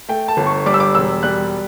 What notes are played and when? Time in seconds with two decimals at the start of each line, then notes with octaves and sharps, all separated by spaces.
0.08 A3 G5
0.28 A5
0.37 G1
0.47 C#6
0.66 G3 D6
0.74 E6
0.80 D6
0.95 E1 E6
1.23 G3 F#6